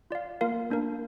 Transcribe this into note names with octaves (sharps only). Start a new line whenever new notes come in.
F4 D5 F5
A#3 F4 A#4 F5
A#3 D4 A#4